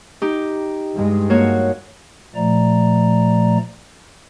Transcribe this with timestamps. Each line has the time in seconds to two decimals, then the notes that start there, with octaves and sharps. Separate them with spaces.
0.22 D#4 G4
0.95 G2 G#3
1.30 A#3 F#4 C#5
2.35 A#2 F3 A3 D5 A#5